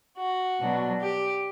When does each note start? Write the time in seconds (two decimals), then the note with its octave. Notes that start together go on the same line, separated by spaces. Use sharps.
0.17 F#4
0.60 B2 F#3 B3 D4
1.01 G4